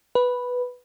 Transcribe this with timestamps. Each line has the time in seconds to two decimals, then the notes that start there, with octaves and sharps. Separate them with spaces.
0.15 B4